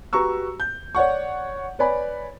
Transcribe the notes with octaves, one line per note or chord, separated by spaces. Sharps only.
F#4 G4 B4 A#5 C#6 E6
G6
C#5 D5 F#5 C#6
B4 C#5 D5 G#5 B5